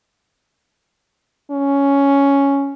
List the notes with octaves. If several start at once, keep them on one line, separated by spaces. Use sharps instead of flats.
C#4